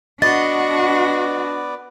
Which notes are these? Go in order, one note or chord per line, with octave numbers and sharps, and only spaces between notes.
B3 D4 F#4 B4 D5 D#5 A6